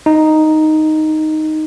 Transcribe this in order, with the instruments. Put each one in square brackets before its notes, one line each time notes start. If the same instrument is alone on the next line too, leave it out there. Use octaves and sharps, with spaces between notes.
[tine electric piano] D#4